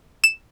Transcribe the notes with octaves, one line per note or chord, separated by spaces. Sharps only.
E7